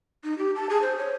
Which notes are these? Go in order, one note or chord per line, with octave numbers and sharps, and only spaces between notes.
D#4
G4
A5
G#4
C5
C#5